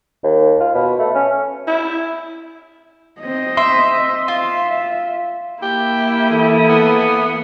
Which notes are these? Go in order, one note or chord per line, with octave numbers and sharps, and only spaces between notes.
D#2
F4
B2
A3
C#4
E4
C4 D#5
E5 C6
F4 E5
A#3 E4 G4
E3 A4 D#6
B3